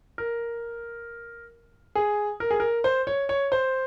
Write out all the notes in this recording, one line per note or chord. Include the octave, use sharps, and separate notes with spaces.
A#4
G#4
A#4
G#4
A#4
C5
C#5
C#5
C5